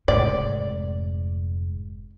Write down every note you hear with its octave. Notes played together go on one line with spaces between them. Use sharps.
F1 G#2 D5